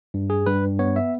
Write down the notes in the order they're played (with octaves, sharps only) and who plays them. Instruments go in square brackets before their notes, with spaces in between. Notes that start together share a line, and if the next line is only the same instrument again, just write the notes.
[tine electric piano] G2
G#4
G2 B4
B3 C#5
E5